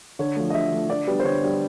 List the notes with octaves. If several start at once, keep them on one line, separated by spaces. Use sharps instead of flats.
D3 C#5
F3 A3
D#5
D3 E5
F3 A3
D3 D5
G3 B3 D4
C5
D3 C#5
G3 B3 D4